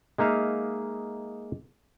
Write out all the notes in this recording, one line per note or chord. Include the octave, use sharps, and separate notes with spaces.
G#3 A#3 D#4 E5 F5